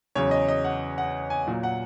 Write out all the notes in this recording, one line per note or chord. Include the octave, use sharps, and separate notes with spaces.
E2 C#3 F#3 C#5
D#5
D#5
F#5
F#5
G#5
A#2 F#3
F#5